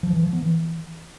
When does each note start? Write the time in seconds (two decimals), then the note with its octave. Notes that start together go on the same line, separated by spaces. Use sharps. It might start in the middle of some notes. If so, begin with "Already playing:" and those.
0.03 F3
0.13 E3
0.23 F3
0.33 B3
0.43 E3